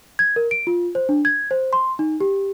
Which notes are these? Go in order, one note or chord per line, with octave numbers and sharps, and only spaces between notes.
G#6
A#4
D7
F4
C5
D4
G#6
C5
C6
D#4
G4